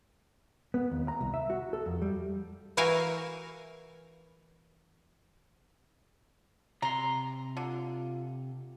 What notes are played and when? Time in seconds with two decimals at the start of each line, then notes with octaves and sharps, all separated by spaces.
0.74 B3
0.91 D#2
1.08 A#5
1.21 C2
1.34 E5
1.50 F#4
1.73 A4
1.86 F2
2.02 G3
2.77 E3 E4 F#4 A#4 F5 G#5
6.82 C3 A#5 C6
7.57 D3 F4